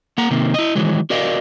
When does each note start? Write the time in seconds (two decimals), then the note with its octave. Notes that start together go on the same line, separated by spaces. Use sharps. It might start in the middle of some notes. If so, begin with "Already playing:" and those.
0.18 A#3 F#5 A#5
0.31 C3 D#3 A#3
0.54 E4 D#5
0.75 D#3 E3 F#3 G#3
1.10 F#4 A#4 D5 D#5 F5